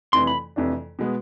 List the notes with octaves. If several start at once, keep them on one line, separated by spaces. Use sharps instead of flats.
F2 C3 E3 A3 D4 C6
B5
F2 C3 E3 A3 D4
B2 G#3 B3